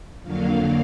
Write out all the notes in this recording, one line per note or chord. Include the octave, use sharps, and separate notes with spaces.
F2 D3 F#3 A#3 F5